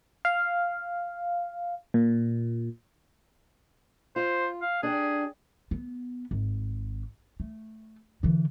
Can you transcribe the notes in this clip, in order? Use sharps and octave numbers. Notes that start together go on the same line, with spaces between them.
F5
A#2
F4 C5
F5
D4 G4 G#4
B3
G#1
A3
D3 E3